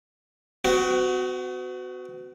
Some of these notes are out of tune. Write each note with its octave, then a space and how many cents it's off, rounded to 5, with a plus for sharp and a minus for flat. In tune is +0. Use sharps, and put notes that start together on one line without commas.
B3 +45 F#4 +0